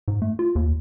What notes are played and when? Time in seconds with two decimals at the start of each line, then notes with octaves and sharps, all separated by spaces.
0.08 G#2
0.22 A3
0.39 F4
0.55 D#2